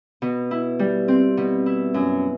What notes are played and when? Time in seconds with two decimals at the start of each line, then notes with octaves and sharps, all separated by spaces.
0.22 B2
0.51 E4
0.79 G3
1.08 C4
1.37 B2
1.66 E4
1.94 F#2